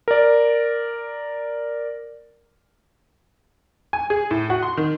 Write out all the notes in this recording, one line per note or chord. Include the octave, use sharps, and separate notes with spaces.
A#4 D5
G#5
G#4
A2
F#4
C6
D#3